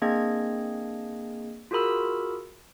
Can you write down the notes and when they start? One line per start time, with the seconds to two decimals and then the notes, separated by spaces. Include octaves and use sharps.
0.02 A#3 C4 D4 G#4 D#5 G#6
1.71 F4 F#4 G#4 A#4 B5 E6